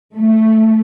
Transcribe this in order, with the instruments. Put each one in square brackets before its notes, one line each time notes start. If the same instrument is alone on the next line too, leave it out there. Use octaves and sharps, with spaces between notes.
[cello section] A3